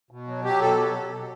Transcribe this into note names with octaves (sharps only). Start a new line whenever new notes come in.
B2
F#3
F#3 G4
B2 A4
F#3